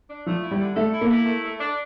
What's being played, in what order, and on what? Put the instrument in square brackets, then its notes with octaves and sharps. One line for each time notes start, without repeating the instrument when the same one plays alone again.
[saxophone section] D4
[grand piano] F3 [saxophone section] A3
[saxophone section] E4
[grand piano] G3
[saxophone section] D3
[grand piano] A3 [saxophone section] A4
[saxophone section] E4
[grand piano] A#3
[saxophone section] E4
A3
A3
D4